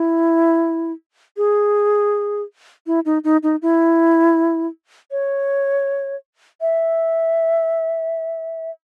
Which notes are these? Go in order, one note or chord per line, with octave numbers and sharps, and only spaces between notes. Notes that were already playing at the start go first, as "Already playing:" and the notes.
Already playing: E4
G#4
E4
D#4
D#4
D#4
E4
C#5
E5